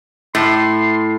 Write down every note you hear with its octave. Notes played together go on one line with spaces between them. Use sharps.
A2 C6